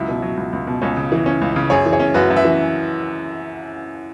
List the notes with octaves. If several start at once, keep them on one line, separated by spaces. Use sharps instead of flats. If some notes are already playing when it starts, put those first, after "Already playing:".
Already playing: C#2 F#3 E4
B2
F#3
C#2
C#2
B2
C#2 C#4
C#3
E3
C#4
C#2
C#3
F#2 G#4 C#5
E3
G#4 C#5
C#4
F#2 F#4 B4
F#2
B4 E5
E3